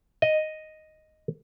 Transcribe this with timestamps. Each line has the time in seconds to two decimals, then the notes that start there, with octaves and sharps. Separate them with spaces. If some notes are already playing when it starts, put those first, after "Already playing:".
0.22 D#5